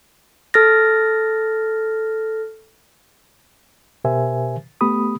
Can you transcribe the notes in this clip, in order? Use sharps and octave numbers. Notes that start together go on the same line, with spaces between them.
A4 F6 A6 A#6
B2 G4 A#4 C5 E5 G#5
A3 B3 G4 B5 D#6